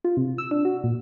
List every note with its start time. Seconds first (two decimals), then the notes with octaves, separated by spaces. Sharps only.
0.04 F4
0.17 C3
0.38 E6
0.51 D4
0.65 F#4
0.84 A#2